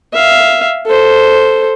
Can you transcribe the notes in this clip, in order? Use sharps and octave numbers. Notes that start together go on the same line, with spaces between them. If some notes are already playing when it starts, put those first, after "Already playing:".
E5 F5
A4 C5